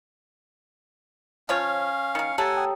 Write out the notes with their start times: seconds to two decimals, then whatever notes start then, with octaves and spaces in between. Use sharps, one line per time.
1.49 F3 C#4 F4 C#5 F5
2.15 D#3 A#3 C#7
2.38 A3 G4 A4 C#5 F#5 G#5 A#5
2.57 G5 D#6